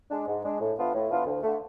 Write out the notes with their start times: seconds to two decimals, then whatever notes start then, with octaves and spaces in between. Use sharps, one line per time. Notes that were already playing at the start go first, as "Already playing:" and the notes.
0.10 G#3 D4
0.27 G#2
0.44 G#3 D4
0.60 A2
0.77 E3 B3 D4 F4
0.94 A2
1.10 E3 B3 D4 F4
1.26 D2
1.43 D3 A3